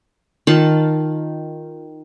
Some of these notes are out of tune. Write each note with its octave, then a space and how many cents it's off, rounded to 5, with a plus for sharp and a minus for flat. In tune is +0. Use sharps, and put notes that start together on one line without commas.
D#3 +0 F4 +0 A5 +0